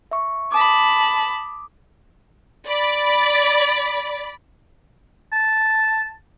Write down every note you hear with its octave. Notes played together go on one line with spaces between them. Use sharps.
E5 C#6
A5 B5 D6 D#6
D5 B5
A5